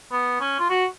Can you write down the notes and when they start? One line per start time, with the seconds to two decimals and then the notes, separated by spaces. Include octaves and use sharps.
0.12 B3
0.41 C#4
0.60 F4
0.70 F#4